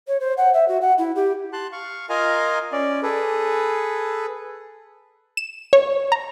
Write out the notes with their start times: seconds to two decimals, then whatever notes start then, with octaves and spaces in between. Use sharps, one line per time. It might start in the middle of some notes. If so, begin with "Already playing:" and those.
0.07 C#5
0.20 C5
0.37 F#5
0.53 E5
0.68 F#4
0.81 F#5
0.98 E4
1.15 G4
1.53 A5 C6 F#6
1.72 F5 C#6
2.09 F4 A#4 D#5 F5 G#5 A#5
2.72 C#4 D5
3.03 G#4 A4 B4
5.37 E7
5.73 C#5
6.12 A#5